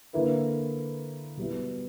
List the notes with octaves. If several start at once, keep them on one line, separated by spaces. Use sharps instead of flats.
D3 A#3 E4 B4
B2 G3 B3 E4